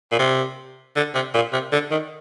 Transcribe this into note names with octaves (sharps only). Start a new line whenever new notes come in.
A#2
C3
D3
C3
A#2
C3
D3
D#3